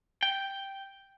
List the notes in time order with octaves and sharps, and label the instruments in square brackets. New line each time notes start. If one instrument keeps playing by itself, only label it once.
[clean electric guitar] G5